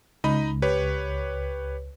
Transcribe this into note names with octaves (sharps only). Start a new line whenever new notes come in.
C#2 D#4 D#5 B5
G4 B4 C#5